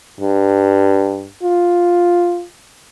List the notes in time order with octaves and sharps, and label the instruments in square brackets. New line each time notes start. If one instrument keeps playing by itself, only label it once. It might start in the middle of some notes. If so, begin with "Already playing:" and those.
[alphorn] G2
F4